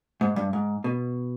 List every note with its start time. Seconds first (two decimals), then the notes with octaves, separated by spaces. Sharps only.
0.21 G#2
0.36 G2
0.53 G#2
0.84 B2